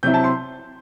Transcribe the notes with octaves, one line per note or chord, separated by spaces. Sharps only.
C3 F#3 C4 E4 G6
A5
C6